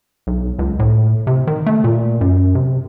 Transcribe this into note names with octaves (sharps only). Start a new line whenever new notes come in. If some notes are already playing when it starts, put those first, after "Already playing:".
B1
C#2
A2
C3
D#3
A3
A#2
F#2
C3